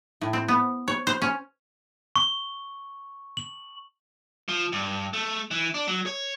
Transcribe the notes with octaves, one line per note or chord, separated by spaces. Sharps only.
A2
C4
B3
C#5
C5
C#4
C#6
F#7
F3
G2
A3
E3
D4
F#3
C#5